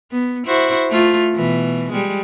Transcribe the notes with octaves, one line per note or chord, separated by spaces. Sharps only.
B3
E4 F#4 C5
A3 F4
B2 E3
G3 G#3